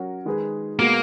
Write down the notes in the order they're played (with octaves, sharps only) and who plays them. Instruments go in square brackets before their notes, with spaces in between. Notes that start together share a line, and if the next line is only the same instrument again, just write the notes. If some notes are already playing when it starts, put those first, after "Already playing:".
Already playing: [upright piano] F#3 C#4 F#4 A#4
D#3 G#3 D#4 G#4 B4
[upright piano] B2 G#3 B3 F#4 [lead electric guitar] A#3